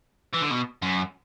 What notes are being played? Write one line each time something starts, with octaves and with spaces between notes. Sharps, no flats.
E3
D3
B2
F#2